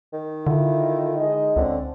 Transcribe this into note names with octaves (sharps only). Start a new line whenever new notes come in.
D#3
D3 E4 F4 A4
G#3 D#4 D#5
C#2 D3 C4 C#4